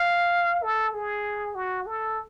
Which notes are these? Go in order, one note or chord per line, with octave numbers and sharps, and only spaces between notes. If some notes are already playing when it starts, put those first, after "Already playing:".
Already playing: F5
A4
G#4
F#4
A4